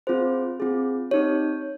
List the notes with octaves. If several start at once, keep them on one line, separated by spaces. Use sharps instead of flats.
C4 F4 G#4 C5
C4 F4 G#4
C4 D#4 G4 C#5